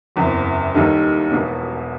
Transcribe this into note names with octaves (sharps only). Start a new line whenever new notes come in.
F#1 E2 C3
D#2 D#3 G3 D#4 A4
E1 E2 B2